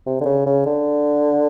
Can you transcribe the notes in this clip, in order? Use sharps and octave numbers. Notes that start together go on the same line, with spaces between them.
C3
D3
C#3
C#3
D3